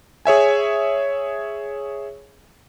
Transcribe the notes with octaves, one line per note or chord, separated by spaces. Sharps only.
G#4 C#5 E5 G#5